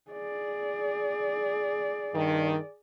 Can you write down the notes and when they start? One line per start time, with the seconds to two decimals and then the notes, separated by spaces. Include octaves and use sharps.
0.11 G#4 D5
2.14 G2 D#3